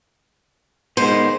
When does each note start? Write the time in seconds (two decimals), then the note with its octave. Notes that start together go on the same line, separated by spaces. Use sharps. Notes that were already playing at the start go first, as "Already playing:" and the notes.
0.97 D#3 G#3 B3 C5